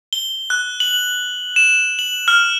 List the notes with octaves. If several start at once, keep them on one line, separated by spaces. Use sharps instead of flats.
G7
F#6
F#7
E7
F#7
F6